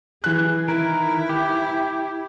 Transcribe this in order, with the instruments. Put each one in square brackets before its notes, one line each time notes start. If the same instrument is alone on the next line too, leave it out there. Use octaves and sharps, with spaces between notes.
[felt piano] E3 F#6 [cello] G#4
[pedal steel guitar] D#3 A#4 [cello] E4
[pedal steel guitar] G4